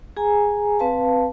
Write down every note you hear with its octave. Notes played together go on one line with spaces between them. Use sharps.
G#4 G#5 A#5
C4 B4 F5 A5